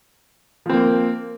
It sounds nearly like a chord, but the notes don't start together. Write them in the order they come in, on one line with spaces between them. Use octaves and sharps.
F3 C4 A#3